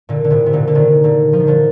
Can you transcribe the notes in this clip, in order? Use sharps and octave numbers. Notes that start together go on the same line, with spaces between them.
A#2 D3
D3
A2 C3
C3
A#2 D3
D3
C3 D#3
A#2 D3
F3
D#3
D3 F3